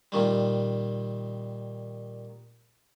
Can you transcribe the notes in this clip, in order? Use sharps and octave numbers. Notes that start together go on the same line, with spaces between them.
A#2 D#3 G3